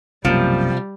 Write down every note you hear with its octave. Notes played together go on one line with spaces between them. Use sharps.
B1 F#2 C3 F3 G3 A#3